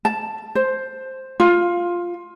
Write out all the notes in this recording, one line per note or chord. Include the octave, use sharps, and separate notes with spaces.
A5
C5
F4